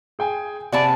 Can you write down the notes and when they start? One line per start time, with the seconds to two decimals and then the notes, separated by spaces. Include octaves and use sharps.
0.19 G#4 G5 G#5
0.72 C3 D5 F#5 G#5 A5 B5